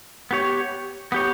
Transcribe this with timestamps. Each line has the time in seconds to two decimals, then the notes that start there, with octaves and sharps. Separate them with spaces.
0.31 B3 G4 C#5
1.12 B3 G4 C#5